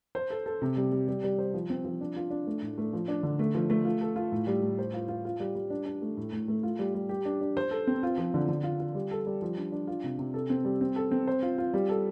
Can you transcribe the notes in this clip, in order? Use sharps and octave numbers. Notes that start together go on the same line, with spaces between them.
C5
A4
A4
C3
G3
G3
G3
G3
C5
F3
C4
F3
D4
F4
D4
A3
A2
A3
F3
D4
D3
A3
F3
A3
F4
A4
F4
A2
G3
A2
C5
F4
F4
F4
G3
G3
D4
D4
A3
A2
A2
A3
F4
G3
G3
G4
D4
D4
C5
A4
C4
F4
F3
D3
D3
F4
F4
G3
A4
G3
F3
D4
D4
F4
C3
C3
A4
C4
G3
C4
A4
C4
C5
F4
F4
G3
A4